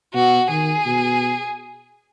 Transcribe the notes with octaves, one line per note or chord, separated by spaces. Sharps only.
B2 F#4
D#3 G#4
B2